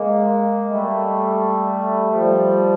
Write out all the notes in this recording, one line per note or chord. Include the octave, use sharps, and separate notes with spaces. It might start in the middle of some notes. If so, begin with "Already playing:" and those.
Already playing: G#3 A#3
G3 A3
F3 G3